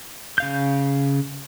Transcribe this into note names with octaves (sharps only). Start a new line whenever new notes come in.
C#3 F5 G6